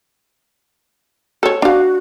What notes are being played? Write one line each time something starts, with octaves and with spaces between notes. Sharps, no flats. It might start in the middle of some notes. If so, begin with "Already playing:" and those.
A4 C#5
D4 F#4 F5